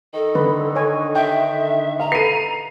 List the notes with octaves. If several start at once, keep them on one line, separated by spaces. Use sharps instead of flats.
D#3 A4
D3 B4
C#5 G#5
E5 G5
F5 A#5
A4 B4 C7 D#7